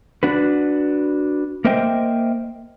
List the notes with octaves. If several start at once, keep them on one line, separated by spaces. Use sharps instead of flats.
D4 F#4 B4
A#3 A#4 C5 D#5 E5 G5